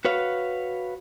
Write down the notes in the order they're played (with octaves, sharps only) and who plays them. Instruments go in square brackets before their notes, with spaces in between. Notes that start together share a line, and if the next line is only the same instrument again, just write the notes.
[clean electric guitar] F#4 B4 C#5 F5